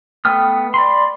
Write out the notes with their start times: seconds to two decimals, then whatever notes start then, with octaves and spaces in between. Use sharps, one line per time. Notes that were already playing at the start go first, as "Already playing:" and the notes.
0.25 A3 B3 G5 D#6 F6
0.74 D5 B5 C6